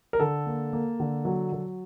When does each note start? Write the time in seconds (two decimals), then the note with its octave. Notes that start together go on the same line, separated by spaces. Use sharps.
0.13 A#4
0.20 D3 A4
0.46 A#3
0.73 A#3
1.00 D3
1.25 F#3
1.52 F#3